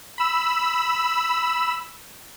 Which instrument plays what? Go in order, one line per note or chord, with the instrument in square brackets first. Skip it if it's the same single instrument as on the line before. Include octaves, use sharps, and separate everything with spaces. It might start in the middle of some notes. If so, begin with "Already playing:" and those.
[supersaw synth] B5 E6